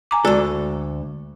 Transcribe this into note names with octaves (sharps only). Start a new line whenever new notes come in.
G#5 A#5 D6
D2 G#3 F#4 A4 D5